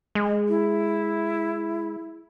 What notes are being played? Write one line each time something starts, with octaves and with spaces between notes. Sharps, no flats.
G#3
E4